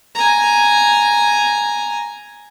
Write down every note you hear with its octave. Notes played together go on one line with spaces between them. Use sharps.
G#5 A#5